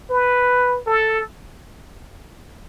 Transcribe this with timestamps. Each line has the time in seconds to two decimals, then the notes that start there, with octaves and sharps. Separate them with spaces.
0.10 B4
0.87 A4